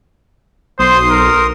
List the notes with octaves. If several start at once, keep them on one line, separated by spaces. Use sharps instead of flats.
B1 C5 C6 D#6
A#4